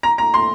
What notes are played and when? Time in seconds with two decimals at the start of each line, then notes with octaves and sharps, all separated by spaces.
0.03 A#5
0.18 A#5
0.34 C6